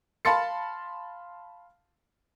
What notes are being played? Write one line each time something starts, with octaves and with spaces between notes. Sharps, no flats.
F5 A5 B5 C6 A6 C#7